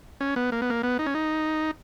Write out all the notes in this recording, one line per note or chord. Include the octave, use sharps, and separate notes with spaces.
C#4
B3
A#3
B3
A#3
B3
D#4
C#4
D#4